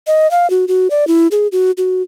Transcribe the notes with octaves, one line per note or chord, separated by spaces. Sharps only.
D#5
F5
F#4
F#4
D5
E4
G#4
F#4
F#4